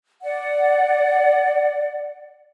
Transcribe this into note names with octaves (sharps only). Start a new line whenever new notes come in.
D5 F#5